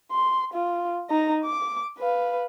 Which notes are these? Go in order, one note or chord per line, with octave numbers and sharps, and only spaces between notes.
C6
F4
D#4 A#5
D6
B4 F5